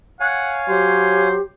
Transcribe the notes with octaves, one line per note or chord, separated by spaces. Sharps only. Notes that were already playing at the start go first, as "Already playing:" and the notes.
C#5 F5 F#5 G#5
F#3 G4 C5